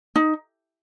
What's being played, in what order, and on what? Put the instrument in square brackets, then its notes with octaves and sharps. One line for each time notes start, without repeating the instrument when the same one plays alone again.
[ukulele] D#4